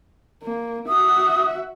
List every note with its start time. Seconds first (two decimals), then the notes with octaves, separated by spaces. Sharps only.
0.43 A#3
0.88 F#4 E5 D#6